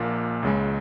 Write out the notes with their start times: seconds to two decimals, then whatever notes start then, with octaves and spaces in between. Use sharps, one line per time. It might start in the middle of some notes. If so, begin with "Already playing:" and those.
Already playing: A#1 A#2 A#3 F4
0.43 C#2 C#3 G#3